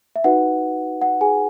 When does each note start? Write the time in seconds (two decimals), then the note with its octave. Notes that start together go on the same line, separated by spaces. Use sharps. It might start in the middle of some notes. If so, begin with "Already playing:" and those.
0.16 E5
0.24 D#4 F#4 B4 F#5
1.02 F#5
1.21 G#4 G#5